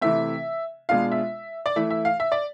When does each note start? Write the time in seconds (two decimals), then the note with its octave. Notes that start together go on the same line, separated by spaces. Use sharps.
0.01 C3 E3 A3 C4 E5
0.89 B2 G#3 D4 F4 F5
1.11 E5
1.66 D5
1.76 E3 A3 E4 E5
1.90 E5
2.05 F5
2.20 E5
2.32 D5